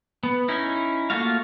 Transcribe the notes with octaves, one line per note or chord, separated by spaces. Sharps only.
B3
C#4 D#4 E4
A3 A#3 F4 F#4 F5